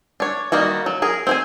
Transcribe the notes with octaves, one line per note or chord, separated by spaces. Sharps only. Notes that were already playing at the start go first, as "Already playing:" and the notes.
D4 C#5
D#3 G3 A#3 F#4
F#3
G#4 A#4
C4 C5 G#5